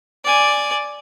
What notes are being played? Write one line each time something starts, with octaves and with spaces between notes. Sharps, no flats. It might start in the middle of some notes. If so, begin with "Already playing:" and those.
D5 G#5